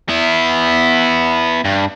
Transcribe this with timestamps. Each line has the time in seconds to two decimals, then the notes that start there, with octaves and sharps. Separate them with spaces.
0.09 B3 E4
1.65 G2